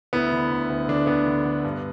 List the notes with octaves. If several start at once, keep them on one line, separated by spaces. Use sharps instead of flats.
D2 B3 E4
D3
D2
D2
D3 D4
D2 B3
D3
D3
G2